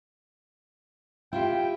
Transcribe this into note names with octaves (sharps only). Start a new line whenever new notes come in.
E4 F4 G4 G5